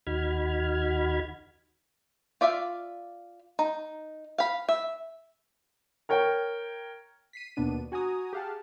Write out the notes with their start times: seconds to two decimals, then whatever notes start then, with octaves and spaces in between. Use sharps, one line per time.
0.07 D#2 D#4 F#4 B5 F6 G#6
2.41 F4 D5 E5 F5
3.59 D#4
4.38 F5 B5
4.69 E5
6.09 A#4 C#5 G5
7.33 B6 C7 D#7
7.56 D#2 B2 B3 D4 D#7
7.92 F#4 G#5 A#5 D#6
8.33 G4 G#4 F5 F#5 A5